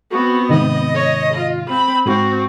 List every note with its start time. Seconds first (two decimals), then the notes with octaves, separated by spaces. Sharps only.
0.11 B3 C4 F#4
0.49 G#2 C3 D#3 D#5
0.94 C#5
1.34 F4
1.69 C4 B5
2.06 G#2 C4 F#4